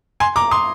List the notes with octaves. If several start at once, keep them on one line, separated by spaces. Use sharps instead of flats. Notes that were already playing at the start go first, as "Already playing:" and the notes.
G#5 C6
A#5 D6
C6 D#6